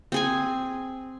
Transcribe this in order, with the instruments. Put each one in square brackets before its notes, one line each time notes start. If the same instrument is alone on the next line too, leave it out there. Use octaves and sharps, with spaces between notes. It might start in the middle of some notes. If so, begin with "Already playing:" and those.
[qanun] C4 G#4 G#5